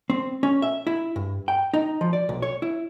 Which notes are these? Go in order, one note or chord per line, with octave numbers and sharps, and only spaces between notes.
C4
C#4
E5
E4
G2
G5
D#4
F3
D5
B1
C#5
E4